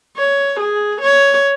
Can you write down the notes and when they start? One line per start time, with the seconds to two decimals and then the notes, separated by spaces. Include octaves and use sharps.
0.17 C#5
0.59 G#4
1.01 C#5